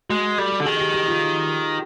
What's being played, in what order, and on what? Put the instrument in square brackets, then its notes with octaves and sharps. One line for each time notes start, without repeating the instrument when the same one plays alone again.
[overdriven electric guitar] G#3 [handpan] F#4
[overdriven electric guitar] G3 [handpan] A4
[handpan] G4
[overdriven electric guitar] D3
[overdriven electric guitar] D#3 [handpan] G#4
[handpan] G4
G4
F4